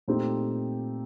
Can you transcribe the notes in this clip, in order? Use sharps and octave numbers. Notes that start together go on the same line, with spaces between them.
A#2 A3 C4 D#4 G4